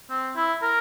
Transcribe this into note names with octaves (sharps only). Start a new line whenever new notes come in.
C4
E4
A#4